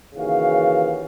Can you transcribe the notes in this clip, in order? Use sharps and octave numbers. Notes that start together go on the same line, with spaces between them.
D#2 C#3 E3 F#4 F5